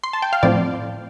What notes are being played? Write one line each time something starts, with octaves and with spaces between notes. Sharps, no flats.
C6
A5
G5
F5
A2 F3 C4 D5